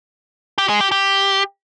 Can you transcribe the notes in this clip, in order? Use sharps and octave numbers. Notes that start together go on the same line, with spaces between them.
G4
G#3
G4
G4